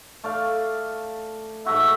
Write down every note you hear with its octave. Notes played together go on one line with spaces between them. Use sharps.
A3 D5 F5
G#2 A3 F#4 E5